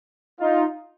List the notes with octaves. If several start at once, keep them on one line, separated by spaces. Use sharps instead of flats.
D#4 F4